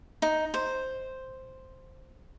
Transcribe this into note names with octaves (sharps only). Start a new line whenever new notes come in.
D#4
C5